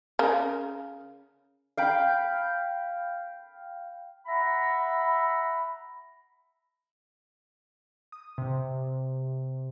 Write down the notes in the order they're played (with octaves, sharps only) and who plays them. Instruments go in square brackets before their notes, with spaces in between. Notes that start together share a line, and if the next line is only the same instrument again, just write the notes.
[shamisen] C#3 A#4
[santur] F5 G5 B5
[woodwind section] E5 F#5 A#5 B5
[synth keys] D#6
C3